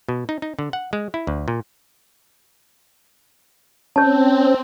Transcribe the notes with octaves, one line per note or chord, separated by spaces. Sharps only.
B2
D#4
D#4
D3
F#5
G#3
E4
D2
A#2
C4 C#4 C#5 A5